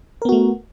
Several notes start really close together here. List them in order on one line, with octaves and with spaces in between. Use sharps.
A#4 B3 F#4 A3